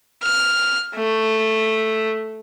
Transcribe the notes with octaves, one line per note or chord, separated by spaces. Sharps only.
F6
A3